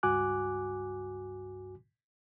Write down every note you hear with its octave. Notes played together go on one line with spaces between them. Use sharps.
C#2 G2 F#4 G#5 D6 F#6